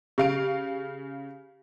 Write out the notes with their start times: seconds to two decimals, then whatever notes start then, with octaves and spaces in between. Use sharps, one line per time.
0.18 C#3 G4 F5 D7